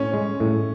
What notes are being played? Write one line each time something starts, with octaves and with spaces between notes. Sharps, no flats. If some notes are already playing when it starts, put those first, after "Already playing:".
Already playing: A2 C#4
G#3
A2